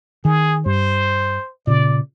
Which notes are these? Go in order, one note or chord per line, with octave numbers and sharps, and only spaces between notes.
D#3 G#4
G2 C5
A#2 C#3 D5